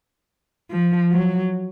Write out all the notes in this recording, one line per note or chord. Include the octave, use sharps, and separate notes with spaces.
F3
F#3